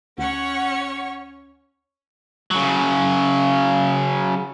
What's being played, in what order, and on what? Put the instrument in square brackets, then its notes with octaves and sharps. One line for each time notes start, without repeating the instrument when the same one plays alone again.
[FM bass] D2 [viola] C#4 C#5 [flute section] F#5
[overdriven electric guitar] C#3 F#3